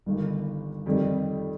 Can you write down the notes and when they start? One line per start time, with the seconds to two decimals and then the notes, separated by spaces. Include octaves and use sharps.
0.06 G1 G2 D#3
0.86 F2 D#3 G3 C4 G4